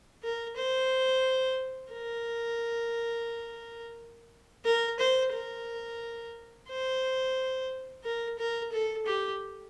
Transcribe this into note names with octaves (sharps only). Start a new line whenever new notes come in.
A#4
C5
A#4
A#4
C5
A#4
C5
A#4
A#4
A4
G4